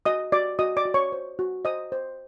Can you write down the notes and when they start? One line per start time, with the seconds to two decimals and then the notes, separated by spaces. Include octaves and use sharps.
0.05 F#4 D#5 D#6
0.32 F#4 D5 D6
0.59 F#4 D#5 D#6
0.77 D5 D6
0.85 F#4
0.94 C#5 C#6
1.12 C5
1.39 F#4
1.65 C5 D#5 D#6
1.92 C5